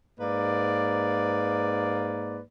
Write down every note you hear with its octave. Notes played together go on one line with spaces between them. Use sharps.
G#2 A#3 B4 D5